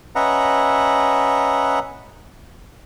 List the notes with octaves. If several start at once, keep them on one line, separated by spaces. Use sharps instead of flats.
C#4 B4 D#5 E5 F#5 A#5